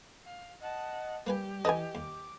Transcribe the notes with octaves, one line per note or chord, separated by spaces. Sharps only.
F5
D#5 F#5 A5
G3 A#3 G4 B4 G#5
E3 A4 B4 D#5 G#5 A5
D#2 D6